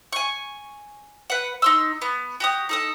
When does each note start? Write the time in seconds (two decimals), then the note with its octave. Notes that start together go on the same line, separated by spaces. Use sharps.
0.13 G#5 C#6
1.30 B4 F#5
1.62 D#4 C6 E6
2.02 B3
2.40 F#4 G4 D#6
2.69 D#4 A4 D#6